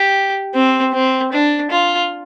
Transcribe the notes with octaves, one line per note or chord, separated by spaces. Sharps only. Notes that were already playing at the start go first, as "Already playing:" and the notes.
Already playing: G4
C4
C4
D4
F4